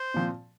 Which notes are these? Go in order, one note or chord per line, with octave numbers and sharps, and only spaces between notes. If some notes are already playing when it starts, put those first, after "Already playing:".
Already playing: C5
A#2 F3 C4